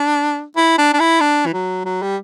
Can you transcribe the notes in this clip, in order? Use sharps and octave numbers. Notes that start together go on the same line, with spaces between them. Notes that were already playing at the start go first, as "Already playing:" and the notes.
Already playing: D4
E4
D4
D4
E4
D4
E3
F#3
F#3
G3